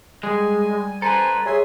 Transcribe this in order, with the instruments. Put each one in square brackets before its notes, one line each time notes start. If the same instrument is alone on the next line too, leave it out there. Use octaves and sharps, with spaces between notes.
[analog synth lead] G3 [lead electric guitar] G#3 [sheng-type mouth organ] G#5
[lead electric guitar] A4 B4 [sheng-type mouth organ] C5 G#5 [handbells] A#5
[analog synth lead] G#4 [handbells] C#5 [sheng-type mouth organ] E5 G#5 C6